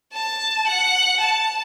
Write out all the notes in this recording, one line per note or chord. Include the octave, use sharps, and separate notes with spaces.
A5
F#5
A5